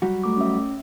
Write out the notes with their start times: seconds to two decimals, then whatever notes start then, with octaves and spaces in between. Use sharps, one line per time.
0.02 F#3 G3 F#4
0.23 A3 D6
0.37 C#4 E5